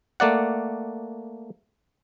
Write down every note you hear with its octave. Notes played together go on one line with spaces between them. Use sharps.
A3 A#3 D5 F#5